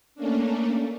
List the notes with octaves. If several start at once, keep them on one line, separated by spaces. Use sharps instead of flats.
A3 A#3 C#4 D4